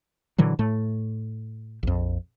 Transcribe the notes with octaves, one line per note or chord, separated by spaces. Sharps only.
A#2 D3 E3 F#3
A2 A3
A#1 F2